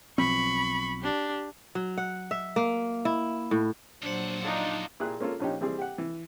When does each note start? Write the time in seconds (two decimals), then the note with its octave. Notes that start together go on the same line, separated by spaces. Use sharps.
0.18 B1 F3 C4 B5 C#6
1.01 D4 G4
1.75 F#3
1.98 F#5
2.31 E5
2.56 A#3
3.05 E4
3.51 A2
4.02 F2 A#2 F#3 D4 C5 F#5
4.42 D4 D#4 F4
5.00 A#2 E4 G4 G#4 F#6
5.19 G#3 A#3 C#4 F4 A4
5.40 A#1 F3 C#4 D#4 G4
5.61 E3 G3 C4 G#4
5.79 G4 F#5
5.98 E3